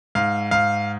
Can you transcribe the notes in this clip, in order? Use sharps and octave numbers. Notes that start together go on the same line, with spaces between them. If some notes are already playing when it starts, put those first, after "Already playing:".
G#2 F5
G#2 F5